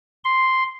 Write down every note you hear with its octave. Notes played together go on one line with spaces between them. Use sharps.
C6